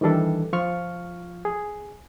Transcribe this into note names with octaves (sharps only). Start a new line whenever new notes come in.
D#3 E3 G3 D4 A4
F3 F4 C#6 F6
G#4